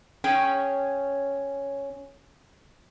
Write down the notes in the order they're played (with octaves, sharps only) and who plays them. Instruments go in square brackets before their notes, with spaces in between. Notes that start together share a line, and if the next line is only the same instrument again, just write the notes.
[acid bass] C#4 [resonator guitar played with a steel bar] G#4 G5